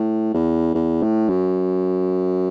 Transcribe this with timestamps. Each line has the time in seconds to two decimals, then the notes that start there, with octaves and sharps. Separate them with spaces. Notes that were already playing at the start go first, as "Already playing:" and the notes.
Already playing: A2
0.34 E2
0.75 E2
1.02 A2
1.29 F#2